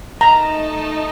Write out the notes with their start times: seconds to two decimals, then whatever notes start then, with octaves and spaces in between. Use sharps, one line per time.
0.21 A3 D#4 A4 D#5 A5 A#5